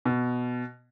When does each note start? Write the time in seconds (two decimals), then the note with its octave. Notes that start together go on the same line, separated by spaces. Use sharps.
0.05 B2